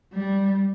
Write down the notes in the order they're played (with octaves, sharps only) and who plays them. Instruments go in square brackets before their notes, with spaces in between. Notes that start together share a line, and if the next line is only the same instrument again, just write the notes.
[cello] G3